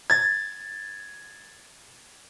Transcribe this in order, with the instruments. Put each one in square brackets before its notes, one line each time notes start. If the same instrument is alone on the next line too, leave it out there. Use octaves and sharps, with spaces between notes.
[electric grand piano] G#6 A6